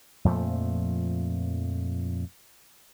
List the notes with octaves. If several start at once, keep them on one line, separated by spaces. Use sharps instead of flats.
F2 A#2 F3 A3